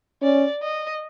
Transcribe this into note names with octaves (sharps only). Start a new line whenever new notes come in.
C#4 D5
D#5